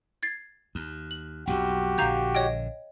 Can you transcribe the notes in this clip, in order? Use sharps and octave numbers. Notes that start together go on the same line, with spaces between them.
G#6 A6 C7
D#2
F#7
B1 F2 F#4 G4
A#1 D3 F5 A#5 G6
C#5 D#5 G5